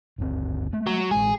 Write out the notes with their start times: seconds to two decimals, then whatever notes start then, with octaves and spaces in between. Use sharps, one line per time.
0.18 G1 D2 C4
0.73 G#3 A3
0.87 F#3
1.11 A1 G#3 G#4